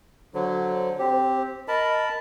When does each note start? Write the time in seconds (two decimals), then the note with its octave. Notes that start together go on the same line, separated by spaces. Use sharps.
0.34 D3 F#3 C5
0.99 C4 G4
1.68 A#4 D#5 A5 B5